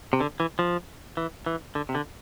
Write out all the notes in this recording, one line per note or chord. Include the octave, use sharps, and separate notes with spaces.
C3
D3
E3
F3
E3
E3
D3
C3
D3